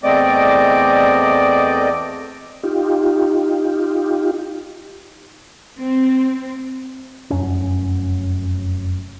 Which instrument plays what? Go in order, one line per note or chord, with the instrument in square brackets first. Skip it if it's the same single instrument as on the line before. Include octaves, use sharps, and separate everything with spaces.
[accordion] E2 A3 C4 D5 D#5 D6
[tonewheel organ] D#4 F4 G4
[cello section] C4
[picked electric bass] F1 F#2 C#4